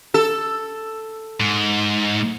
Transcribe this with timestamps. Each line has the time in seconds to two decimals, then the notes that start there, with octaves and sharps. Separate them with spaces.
0.14 A4
1.40 G#2